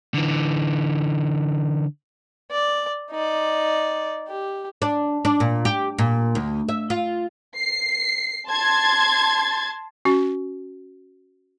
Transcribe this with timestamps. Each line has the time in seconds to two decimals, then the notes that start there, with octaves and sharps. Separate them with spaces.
0.14 D3 E3
2.51 D5
3.11 D#4 D5
4.28 G4
4.82 D4
5.25 D4
5.40 A#2
5.65 G4
5.98 A#2
6.35 D2
6.69 E5
6.90 F4
7.56 C7
8.48 A5 C6 G#6 A6
10.05 C#4 F#4